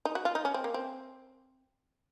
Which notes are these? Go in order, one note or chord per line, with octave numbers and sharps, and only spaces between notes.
D#4
F#4
F4
D#4
C#4
C4
A#3
C4